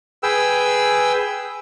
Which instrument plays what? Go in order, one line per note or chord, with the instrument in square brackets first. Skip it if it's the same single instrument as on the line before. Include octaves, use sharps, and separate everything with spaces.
[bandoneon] G#4 B4 G5 E6